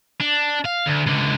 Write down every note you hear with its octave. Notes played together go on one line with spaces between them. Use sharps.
D4
F5
D2
C#2 D3